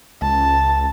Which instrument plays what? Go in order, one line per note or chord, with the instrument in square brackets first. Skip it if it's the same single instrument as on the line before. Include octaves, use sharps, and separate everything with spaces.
[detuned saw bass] C#2 [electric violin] A5